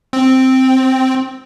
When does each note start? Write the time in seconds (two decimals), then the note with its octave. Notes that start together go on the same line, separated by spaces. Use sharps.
0.13 C4